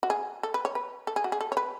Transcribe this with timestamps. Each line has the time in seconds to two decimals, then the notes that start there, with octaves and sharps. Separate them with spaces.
0.03 F#4
0.10 G#4
0.43 A4
0.54 B4
0.65 C#5
0.75 B4
1.07 A4
1.16 G#4
1.24 F#4
1.32 G#4
1.41 A4
1.52 C#5
1.57 B4